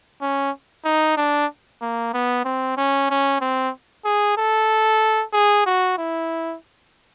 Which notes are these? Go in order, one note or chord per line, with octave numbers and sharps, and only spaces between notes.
C#4
D#4
D4
A#3
B3
C4
C#4
C#4
C4
G#4
A4
G#4
F#4
E4